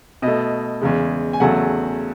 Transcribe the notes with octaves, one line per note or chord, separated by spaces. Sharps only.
B2 A3 D#5
E2 C#3 G#3
G#5
E2 C#3 F#3 A3 F#5